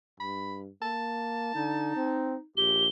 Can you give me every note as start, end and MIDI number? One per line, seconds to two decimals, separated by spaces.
0.20 0.69 43
0.20 0.57 83
0.82 1.53 58
0.82 2.13 81
1.55 1.93 50
1.55 2.45 63
1.96 2.35 60
2.57 2.89 34
2.57 2.86 67
2.57 2.89 103